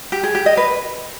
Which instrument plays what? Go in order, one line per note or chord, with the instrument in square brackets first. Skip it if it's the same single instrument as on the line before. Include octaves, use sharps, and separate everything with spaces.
[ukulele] G4
G#4
G4
D#5
B4